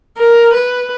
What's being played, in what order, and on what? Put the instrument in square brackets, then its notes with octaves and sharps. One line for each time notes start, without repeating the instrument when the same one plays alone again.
[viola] A#4
B4